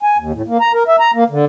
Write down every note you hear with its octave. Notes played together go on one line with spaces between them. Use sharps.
G#5
D#2
A2
A#3
A#5
A#4
E5
A#5
A#3
D3